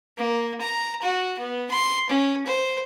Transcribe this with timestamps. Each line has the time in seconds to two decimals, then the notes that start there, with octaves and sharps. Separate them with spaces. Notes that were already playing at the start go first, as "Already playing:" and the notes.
0.17 A#3
0.61 A#5
1.02 F#4
1.39 B3
1.71 C6
2.09 C#4
2.46 C5